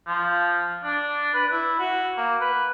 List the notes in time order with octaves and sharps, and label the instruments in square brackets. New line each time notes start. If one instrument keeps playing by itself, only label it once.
[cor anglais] F3
D4
B4
E4
F#4
A#3
B4